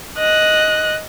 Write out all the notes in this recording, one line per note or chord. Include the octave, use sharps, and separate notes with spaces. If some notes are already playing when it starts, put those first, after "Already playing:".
D#5 F#6